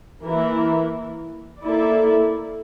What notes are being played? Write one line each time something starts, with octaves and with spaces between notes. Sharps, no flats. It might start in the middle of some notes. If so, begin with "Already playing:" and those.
E3 A#3 E4 A#4
A#3 E4 A4 D5